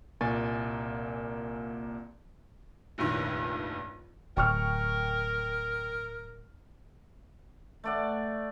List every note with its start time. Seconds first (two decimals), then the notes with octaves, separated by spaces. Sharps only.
0.21 C2 A#2 A#3 G#5 C#6 A6
2.98 F1 A#1 G2 D#3 E4 C#5
4.37 D1 A#4 G5 C#6 F6
7.84 A3 D5 F#5